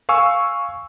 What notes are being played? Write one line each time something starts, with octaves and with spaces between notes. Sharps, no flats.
F5 G#5 C#6 E6